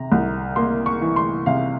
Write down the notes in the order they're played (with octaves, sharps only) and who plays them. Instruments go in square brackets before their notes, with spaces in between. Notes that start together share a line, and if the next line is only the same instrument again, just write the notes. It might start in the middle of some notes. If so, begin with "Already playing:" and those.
Already playing: [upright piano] C3 A#5
C2
A#3 C6
C#6
E3
C6
C3 F5